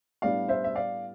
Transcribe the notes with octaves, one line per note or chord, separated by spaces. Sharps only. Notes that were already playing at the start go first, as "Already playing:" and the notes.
A2 G3 B3 D4 D5 F5
C5 E5
E5
D5 F5